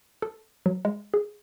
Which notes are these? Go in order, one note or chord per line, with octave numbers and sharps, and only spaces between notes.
A4
F#3
G#3
G#4